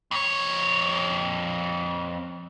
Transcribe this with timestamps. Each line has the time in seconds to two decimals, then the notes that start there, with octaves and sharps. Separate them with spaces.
0.11 F2 C#5